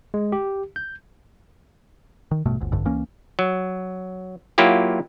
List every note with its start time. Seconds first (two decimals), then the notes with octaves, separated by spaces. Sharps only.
0.14 G#3
0.32 G4
0.76 G6
2.31 D#3
2.46 A1 G2 B2 A3
2.61 G1 D2
2.72 F1 A#1 G2 D3
2.85 C#2 E3 A#3 C#4
3.39 F#3
4.58 F#3 A#3 E4 F4 G4